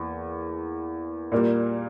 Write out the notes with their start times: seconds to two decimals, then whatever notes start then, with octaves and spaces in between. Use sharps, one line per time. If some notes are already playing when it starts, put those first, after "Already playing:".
Already playing: E2 E3 A#3
1.32 A#2 G3 A#3